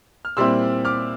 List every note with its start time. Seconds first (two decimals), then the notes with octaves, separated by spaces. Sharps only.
0.25 F6
0.37 A#2 G3 C4 E4 C6 E6
0.85 D6 F6